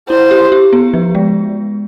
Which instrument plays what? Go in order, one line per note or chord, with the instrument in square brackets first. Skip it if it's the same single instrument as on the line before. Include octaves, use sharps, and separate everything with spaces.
[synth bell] E4 [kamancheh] C5
[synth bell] G4
G4
B3
F3
G#3